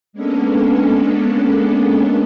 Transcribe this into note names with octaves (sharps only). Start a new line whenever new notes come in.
G#3 A#3 B3 C#4 D4 A4